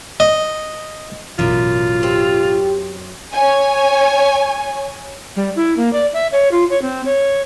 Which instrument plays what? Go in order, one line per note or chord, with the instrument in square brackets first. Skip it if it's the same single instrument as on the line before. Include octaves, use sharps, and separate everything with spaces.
[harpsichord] D#5
[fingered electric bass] A1 B2 E3 [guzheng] F#2 [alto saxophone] F4
[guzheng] C4 [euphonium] G4
[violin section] C#5 G#5
[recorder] G3
E4
A#3
D5
E5
C#5
F4
C#5
C4
C#5